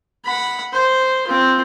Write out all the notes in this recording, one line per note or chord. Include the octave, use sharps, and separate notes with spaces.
F#5 B5
C5
C4 F4